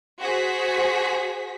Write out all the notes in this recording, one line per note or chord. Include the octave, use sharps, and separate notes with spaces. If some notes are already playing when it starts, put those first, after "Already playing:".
F#4 G#4 C5 B6